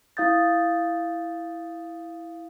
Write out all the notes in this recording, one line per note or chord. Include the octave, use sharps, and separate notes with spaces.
E4 F5 D#6 G6 A6